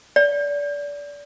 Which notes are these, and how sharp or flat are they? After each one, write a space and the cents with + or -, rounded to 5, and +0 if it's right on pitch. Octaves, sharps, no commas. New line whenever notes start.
D5 -25